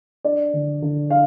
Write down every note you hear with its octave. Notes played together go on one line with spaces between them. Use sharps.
D4 D5
D3
D3
D4 F5